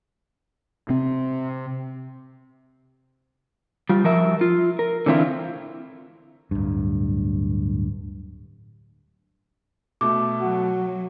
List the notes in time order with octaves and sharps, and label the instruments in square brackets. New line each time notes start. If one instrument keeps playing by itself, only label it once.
[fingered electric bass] C3 C4
[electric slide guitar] G3 F4
F3 A#4 E5
F4
A#4
D3 E3 C4 E4 F4
[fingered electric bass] D1 G2
[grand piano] B2 A3 [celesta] D6
[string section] F#3 [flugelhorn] F#4